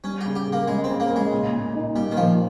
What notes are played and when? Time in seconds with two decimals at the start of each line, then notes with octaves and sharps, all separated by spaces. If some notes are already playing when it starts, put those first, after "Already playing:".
0.04 G3 C#4
0.21 C#3 G4
0.35 G4
0.47 C#3
0.52 A#3
0.68 C#3 G#3
0.84 C#3 C4
1.00 A#3
1.10 C#3
1.16 G#3
1.31 A#2
1.53 A#2
1.74 D#4
1.95 A#2 G3
2.11 D#3
2.16 A#2 F3